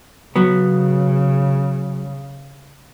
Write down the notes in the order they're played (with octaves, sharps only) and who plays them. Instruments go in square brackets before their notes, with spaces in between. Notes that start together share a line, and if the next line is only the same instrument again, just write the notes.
[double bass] C#3 [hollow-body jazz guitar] F#3 B3